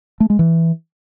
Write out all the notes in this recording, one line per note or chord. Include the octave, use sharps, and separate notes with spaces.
A3
G#3
E3